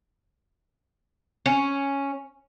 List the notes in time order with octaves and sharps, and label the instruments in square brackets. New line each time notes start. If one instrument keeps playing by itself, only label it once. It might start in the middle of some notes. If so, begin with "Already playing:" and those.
[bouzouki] C#4